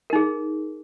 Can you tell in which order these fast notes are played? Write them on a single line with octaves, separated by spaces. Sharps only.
A#4 D#4 G#4